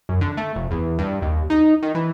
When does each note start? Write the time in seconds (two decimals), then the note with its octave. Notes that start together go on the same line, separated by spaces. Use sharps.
0.09 F#2
0.21 D3
0.37 A3
0.56 F1
0.71 E2
0.99 G2
1.22 D#2
1.50 D#4
1.82 D#3
1.95 E3